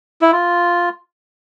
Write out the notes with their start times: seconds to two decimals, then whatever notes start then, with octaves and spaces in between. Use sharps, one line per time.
0.21 E4
0.32 F4